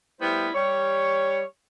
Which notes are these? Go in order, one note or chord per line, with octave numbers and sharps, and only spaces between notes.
G3 A3 B3 E4 C5
G3 C#5